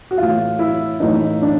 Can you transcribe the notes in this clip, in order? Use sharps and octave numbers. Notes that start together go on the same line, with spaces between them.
F#4
A2 E3 F4
E4
A2 E3 D#4
D4